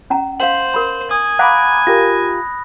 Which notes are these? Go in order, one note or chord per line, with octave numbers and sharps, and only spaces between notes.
C#4 F#5 A#5
C5 F5 F#5 F#7
A#4 B5
G#5 D#6
F5 F#5 A#5 B5 D6 F#6
F4 G4 A#4 A#6